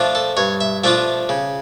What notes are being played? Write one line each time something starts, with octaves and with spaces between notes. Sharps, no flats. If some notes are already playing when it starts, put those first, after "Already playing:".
Already playing: F3 A3 D4 F4
A4
G2 C#5
E5
F3 A3 D4 F4 E5
C#3